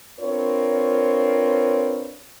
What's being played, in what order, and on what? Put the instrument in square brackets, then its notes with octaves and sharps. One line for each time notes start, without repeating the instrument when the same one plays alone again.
[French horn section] C4 D4 F4 A#4 B4 C#5